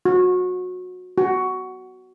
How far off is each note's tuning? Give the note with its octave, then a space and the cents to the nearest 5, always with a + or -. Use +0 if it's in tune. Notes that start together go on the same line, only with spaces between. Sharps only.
F#4 -25
F#4 +10